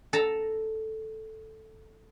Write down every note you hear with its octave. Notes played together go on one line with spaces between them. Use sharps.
A4 A5 A#5